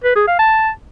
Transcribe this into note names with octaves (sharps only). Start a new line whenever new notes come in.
B4
G#4
F5
A5